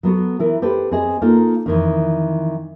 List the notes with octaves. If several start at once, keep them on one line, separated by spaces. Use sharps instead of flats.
F#3 B3 F#4 A4
E3 E4 A#4
G4 A4 B4 C5
C4 G#4 D#5
A#3 D#4 F4 A4
F2 D#3 E3